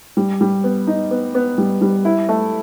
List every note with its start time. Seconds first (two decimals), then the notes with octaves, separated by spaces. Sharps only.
0.17 G3
0.41 G3
0.64 B3
0.87 D#4
1.11 B3
1.35 B3
1.58 G3
1.81 G3
2.05 E4
2.29 A3